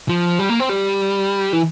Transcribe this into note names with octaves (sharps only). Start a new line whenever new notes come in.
F3
G3
A#3
C4
G3
E3